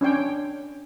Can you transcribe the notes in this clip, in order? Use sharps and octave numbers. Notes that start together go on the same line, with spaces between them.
C#4 D4 C#5 G5